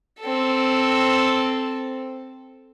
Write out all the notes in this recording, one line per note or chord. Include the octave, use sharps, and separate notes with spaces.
C4 A4